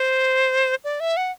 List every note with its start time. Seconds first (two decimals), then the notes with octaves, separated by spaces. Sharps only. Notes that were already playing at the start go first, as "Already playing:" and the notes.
Already playing: C5
0.84 D5
1.00 E5
1.17 F#5